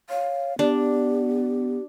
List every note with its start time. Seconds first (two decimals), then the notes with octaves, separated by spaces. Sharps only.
0.10 C#5 F5
0.59 B3 D4 G4